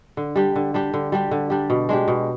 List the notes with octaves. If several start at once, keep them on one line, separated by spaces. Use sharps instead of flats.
D3
G3 D4 G4
D3
G3 D4 G4
D3
G3 D4 G4
D3
G3 D4 G4
B2
G#3 D4 G4
B2